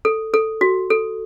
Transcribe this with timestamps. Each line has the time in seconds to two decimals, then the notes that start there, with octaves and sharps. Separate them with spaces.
0.05 A4
0.34 A4
0.61 F#4
0.90 A4